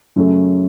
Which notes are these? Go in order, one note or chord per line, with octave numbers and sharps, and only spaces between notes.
F#2 C#3 F#3 A3 C#4